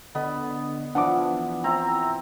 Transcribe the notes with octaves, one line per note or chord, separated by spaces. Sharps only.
D3 B3 D#5 B5
E3 F3 B3 D4 F#5 D6
C4 E4 A#5